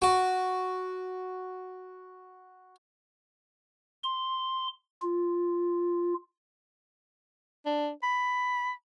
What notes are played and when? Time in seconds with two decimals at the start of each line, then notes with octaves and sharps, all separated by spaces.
0.02 F#4 D6
4.04 C6
5.02 F4
7.66 D4
8.03 B5